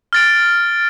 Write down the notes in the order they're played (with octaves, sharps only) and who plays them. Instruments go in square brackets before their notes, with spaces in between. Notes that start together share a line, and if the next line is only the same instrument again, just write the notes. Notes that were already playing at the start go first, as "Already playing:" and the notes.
[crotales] F6 A6 D7